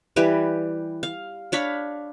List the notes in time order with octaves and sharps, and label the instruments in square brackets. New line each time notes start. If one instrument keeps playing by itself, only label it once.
[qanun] E3 G3 G4 B4
F5
D4 C#5 F5 B5